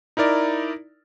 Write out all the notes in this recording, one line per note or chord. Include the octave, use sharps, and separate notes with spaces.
D#4 E4 A#4 D5